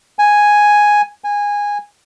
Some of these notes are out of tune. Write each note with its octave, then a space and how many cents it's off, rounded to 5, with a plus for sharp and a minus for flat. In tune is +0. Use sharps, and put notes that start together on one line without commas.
G#5 +0
G#5 -15